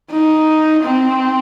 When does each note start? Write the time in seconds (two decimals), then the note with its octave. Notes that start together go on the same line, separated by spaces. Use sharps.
0.11 D#4
0.83 C4